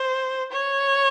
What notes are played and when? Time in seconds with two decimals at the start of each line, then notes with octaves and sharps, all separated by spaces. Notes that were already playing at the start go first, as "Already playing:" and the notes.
Already playing: C5
0.52 C#5